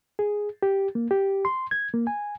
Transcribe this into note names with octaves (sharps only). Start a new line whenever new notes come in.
G#4
G4
A#3
G4
C6
G#6
A#3
G#5